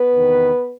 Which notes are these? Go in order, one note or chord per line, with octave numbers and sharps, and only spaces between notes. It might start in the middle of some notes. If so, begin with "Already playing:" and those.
Already playing: B3 B4
E2 C3 D#3